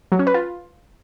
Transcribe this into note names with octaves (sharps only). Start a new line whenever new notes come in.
F#3
C#4
B4
F4